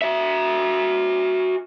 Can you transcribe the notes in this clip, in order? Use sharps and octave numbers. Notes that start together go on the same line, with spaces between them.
F#4 E5